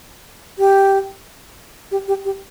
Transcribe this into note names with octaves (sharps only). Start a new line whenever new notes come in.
G4
G4
G4
G4